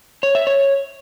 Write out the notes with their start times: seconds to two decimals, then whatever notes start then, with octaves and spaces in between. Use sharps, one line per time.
0.23 C#5
0.35 E5
0.47 C#5